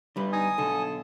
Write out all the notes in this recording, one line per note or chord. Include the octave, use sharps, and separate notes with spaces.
D3 G3 B4
D#4 G#5 D#6
B1 D3 A4